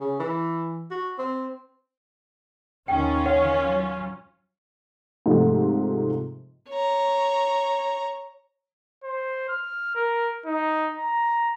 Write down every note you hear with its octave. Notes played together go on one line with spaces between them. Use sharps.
C#3
E3
F#4
C4
D#2 D#3 C#4 F4 G5
C#5 F#5
F#3
G#2 C3 F3 A3
C#5 A#5
C5
F6
A#4
D#4
A#5